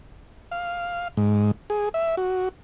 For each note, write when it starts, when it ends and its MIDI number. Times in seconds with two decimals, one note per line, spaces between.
0.51 1.08 77
1.17 1.51 44
1.70 1.89 68
1.94 2.15 76
2.17 2.49 66